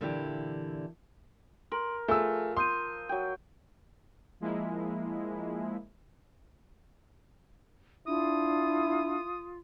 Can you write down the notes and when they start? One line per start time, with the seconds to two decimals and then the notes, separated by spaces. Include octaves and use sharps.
0.01 A#2 D3 E3 D4 E4 G4
1.72 A#4 C6 D7 F#7
2.08 F3 A3 G#4 G#5 E6
2.57 C6 D#6 G6 D#7
3.09 F#3 G5
4.40 F3 G#3 A#3 E4
8.07 D4 E4 F4 D#6